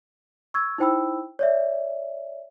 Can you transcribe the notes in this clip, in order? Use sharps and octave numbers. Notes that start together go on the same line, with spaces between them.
C#6 E6 G#6
D#4 E4 C5 G5 B5 E6
C#5 D5 E5